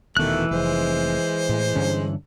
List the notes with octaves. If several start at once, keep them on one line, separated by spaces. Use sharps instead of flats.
D#1 B2 D#3 E3 A3 F#6
F1 G#3 C5
A2
G2 D3 C#4